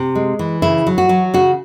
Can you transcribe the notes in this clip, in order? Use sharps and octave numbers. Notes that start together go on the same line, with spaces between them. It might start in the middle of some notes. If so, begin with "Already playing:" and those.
Already playing: C3
G#3
E3
C#3 E4
F#3
F#4
F#3
C#3 F#4